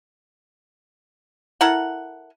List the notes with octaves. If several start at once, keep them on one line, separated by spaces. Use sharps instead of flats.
E4 A4 A#4 F#5